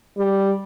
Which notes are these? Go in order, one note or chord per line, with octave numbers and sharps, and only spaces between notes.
G3